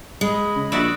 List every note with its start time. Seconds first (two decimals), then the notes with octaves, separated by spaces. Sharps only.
0.21 G#3 D#5 B5 D#6
0.56 C#3
0.72 A#1 F#4 D5 E5